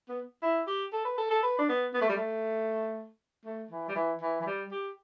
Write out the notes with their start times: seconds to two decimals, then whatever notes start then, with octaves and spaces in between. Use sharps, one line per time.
0.09 B3
0.42 E4
0.67 G4
0.93 A4
1.05 B4
1.18 A4
1.30 A4
1.43 B4
1.58 D4
1.69 B3
1.94 B3
2.01 A3
2.09 G3
2.17 A3
3.46 A3
3.71 E3
3.88 G3
3.95 E3
4.22 E3
4.41 E3
4.46 G3
4.72 G4